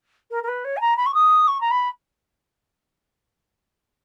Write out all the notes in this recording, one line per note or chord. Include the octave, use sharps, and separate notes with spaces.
A#4
A#4
B4
C#5
G#5
A#5
B5
C#6
D#6
C#6
A#5
B5